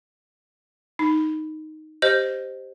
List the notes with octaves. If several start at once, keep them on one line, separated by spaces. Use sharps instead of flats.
D#4
G4 C5 D#5 G6